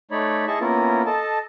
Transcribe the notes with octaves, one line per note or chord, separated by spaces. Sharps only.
A3 D#4 C#5 D5 B5
E4 G#4 D#5 A5 C#6
A#3 B3 C#4 E4 F4 A#4
A4 D#5 A5